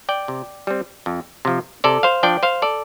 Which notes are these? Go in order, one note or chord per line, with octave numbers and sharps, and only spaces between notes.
D5 G5
C3
G3 C4
F2
C3 F3
C3 A4 D5
C5 F5
F3 D4 D5 G5
C5 F5
A4 D5